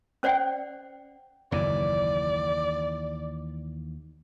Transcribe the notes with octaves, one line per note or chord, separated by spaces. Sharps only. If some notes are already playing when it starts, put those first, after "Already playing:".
C#4 C5 D5 F#5 G5
F#1 D#2 E3 D5